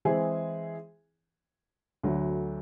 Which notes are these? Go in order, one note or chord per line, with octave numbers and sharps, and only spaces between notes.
E3 G#3 C4 E4 G#4
D2 D3 F#3 A3